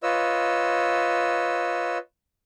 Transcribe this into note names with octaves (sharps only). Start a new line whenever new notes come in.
F4 B4 C#5 D#5 E6